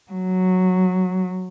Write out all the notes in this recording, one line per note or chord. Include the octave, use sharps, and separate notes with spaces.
F#3